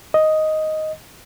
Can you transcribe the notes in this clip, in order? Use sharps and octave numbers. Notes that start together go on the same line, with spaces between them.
D#5